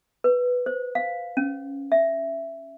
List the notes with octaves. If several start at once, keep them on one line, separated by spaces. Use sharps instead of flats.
B4
C5
F5
C#4
E5